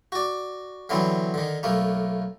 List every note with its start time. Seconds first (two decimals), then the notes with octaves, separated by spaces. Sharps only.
0.12 F#4 D5
0.89 D3 E3 F#3 B3 C4
1.34 D3 D#3
1.63 B1 A3 A#3